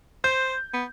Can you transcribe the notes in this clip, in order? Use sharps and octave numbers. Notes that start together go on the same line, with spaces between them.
C5 G6
B3